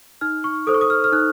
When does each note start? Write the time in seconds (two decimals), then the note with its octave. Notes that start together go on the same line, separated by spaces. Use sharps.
0.21 D#4 F6
0.44 C#6
0.67 A4 C5 D#6
0.74 C#6
0.81 D#6
0.90 F6
1.04 F6
1.12 D#4 F#6